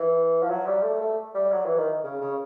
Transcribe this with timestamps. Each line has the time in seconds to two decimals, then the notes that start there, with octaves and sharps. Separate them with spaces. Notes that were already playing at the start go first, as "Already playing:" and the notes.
Already playing: E3
0.42 F3
0.49 F#3
0.66 G3
0.83 A3
1.01 A3
1.34 G3
1.52 F#3
1.65 E3
1.77 D#3
2.04 C#3
2.21 C#3